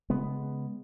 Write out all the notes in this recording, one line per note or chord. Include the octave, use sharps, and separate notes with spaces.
C#3 G#3 B3